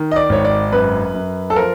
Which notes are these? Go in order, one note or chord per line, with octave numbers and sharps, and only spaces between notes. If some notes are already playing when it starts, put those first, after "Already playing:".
Already playing: D#3
D#5
D5
G#1 C#5
D5
F#2 B4
F#2
A4
F3 A#4